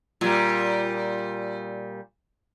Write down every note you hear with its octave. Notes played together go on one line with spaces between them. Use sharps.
A#2 G3